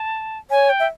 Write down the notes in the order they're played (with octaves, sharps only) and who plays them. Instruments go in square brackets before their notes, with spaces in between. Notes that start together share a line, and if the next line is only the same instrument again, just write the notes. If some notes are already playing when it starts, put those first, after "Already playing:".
Already playing: [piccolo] A5
[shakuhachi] C#5 [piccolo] G#5
[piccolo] G5
[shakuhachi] E5